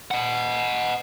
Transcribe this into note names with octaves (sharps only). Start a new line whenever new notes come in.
D#5 F#5